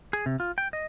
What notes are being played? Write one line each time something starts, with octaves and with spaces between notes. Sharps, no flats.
G#4
C3
F4
G5
D#5